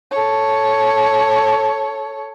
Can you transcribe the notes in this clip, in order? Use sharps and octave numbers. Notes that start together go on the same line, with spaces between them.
A4 C#5